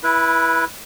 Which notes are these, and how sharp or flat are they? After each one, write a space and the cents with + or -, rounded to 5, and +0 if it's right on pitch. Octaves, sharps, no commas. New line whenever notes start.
E4 +0 B4 -20